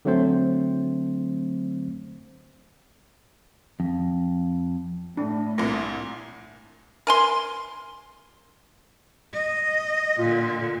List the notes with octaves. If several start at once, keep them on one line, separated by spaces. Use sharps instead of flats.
D3 F#3 A3 C4 C5
F2
A2 D4
C2 A#2
A#4 G#5 C6
D#5
A#2 D3 F4